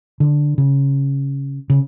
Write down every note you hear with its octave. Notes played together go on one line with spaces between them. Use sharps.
D3
C#3
C#3